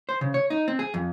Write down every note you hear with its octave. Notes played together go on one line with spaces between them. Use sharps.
C5
C#3
C#5
D#4
C4
G#4
F2